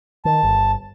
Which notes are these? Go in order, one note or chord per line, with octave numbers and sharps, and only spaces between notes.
D#3 A5
G1